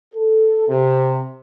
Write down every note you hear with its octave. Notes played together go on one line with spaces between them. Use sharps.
A4
C3